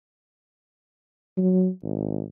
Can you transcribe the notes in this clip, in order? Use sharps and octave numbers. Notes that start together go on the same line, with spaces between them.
F#3
G#1